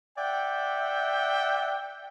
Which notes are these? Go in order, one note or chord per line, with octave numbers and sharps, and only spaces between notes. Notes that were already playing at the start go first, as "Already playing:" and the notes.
D5 E5 F#5 G5